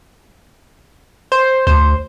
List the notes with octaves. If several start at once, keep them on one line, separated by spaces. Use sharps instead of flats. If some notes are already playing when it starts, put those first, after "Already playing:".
C5
D2 C5